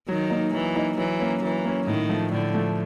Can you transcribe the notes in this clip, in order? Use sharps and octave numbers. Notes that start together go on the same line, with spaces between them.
D#3 F#3
A#3 D#4
E3 F#3
A#3 D#4
E3 F#3
A#3 C#4
E3 F#3
A#3 C#4
A2 D#3
F3 A3
A2 D3
F3 A3